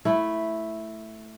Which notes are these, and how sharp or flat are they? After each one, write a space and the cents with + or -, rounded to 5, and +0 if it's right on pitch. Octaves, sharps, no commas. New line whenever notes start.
A3 +0 E4 +0